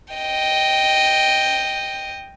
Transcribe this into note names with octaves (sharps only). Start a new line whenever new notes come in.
D#5 G5